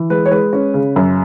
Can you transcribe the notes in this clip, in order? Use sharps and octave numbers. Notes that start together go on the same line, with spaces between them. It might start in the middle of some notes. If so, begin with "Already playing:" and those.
Already playing: E3
G#3 B4
C#5
G#3 B4
C#4
C#3
F#2